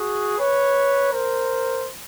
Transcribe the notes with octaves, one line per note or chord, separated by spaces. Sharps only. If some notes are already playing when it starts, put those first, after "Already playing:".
Already playing: F#4 G#4
B4 C#5
A#4 C5